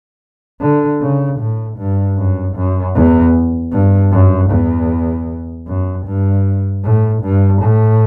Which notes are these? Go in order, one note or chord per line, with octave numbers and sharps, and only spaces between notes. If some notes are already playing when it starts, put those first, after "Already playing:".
D3
C#3
A2
G2
F#2
F#2
E2
G2
F#2
E2
F#2
G2
A2
G2
A2